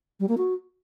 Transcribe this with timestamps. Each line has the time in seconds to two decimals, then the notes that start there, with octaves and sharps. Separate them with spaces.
0.20 G3
0.29 A#3
0.38 F#4